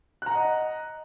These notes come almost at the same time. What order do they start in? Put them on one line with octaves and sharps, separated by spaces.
F#6 A#5 F#5 D#5